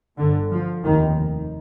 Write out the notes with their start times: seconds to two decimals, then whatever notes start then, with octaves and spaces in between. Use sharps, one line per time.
0.18 G1 G2 D3
0.51 F3
0.83 F1 D#2 D#3